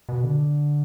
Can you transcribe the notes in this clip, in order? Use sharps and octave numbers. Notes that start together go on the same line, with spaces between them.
B2
D3